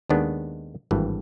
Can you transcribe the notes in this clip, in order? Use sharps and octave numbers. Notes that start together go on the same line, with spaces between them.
D#2 D#3 G#3 B3 D4
G#1 G2 E3 A3